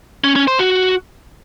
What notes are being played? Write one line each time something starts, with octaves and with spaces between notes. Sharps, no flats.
C#4
C#4
C5
F#4